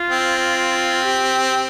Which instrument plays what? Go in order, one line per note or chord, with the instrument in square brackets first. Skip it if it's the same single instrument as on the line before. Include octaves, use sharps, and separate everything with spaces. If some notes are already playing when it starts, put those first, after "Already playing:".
Already playing: [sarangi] F4
[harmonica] C4
[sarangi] G4